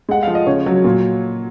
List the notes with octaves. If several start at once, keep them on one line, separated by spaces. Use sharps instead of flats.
G#3 F#5
F3 F5
D#5
C#3 C#5
F#3
A#2